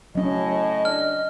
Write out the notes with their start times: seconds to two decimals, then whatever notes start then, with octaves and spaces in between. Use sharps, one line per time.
0.15 A2 F#3 C#4 D#5
0.85 D4 F6